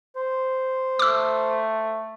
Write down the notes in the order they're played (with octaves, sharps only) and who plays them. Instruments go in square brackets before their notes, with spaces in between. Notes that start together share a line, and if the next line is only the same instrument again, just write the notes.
[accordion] C5
[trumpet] A3 [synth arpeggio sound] D6 E6